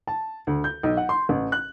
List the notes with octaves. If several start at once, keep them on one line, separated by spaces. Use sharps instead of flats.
A5
D2
G6
B1
F#5
C6
A1
F#6